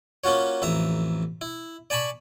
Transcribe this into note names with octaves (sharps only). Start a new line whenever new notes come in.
A#3 C#4 F4 F#4 C#5
A1 F2 E5 A#5
E4
D5 G#5 A5 B5 C#6